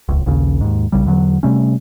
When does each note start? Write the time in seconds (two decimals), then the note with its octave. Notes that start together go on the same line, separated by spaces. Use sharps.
0.09 D#1 C#2
0.26 A#1 D#2 C#3
0.61 D#2 G#2
0.92 B1 C#3 G3
1.06 E2 D3 E3 F#3
1.43 C3 G3 A3 C#4